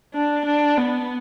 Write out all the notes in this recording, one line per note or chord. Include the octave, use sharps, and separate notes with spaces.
D4
D4
B3